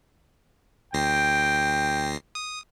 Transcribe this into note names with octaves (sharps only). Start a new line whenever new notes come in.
D2 G5 A#6 C7
D#6